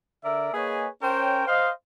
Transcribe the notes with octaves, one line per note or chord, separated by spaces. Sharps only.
D3 A#4 D5 E5
A#3 G#4 B4 C#5 D#5 G#5
C#4 A#4 C5 C#5 G5
C5 D#5 F5